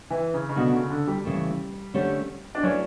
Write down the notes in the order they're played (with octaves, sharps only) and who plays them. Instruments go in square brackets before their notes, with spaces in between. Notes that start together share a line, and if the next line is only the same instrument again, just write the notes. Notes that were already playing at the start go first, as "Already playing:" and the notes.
[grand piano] E3
C#3
C#3
[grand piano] B2 [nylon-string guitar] D3 A3 D4 F#4 B4
[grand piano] C#3
D3
G3
[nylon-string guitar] C#3 E3 A3
D3 A3 C#4 G4 C#5
[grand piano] D4
[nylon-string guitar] F#3 A3 E4 B4 D5 [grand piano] C#4